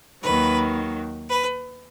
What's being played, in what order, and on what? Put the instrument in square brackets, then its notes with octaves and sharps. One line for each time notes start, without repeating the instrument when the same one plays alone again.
[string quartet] D#2 D#3 F#3 B4
B4